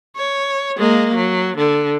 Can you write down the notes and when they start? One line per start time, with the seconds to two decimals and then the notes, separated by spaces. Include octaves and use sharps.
0.16 C#5
0.78 G#3 A#3
1.15 F#3
1.57 D3